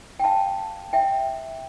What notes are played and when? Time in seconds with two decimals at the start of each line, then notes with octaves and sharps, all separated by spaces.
0.20 G5
0.24 F5 A5
0.93 E5 G5